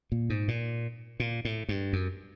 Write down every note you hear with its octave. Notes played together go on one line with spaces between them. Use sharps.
A#2
G#2
A#2
A#2
A2
G2
F#2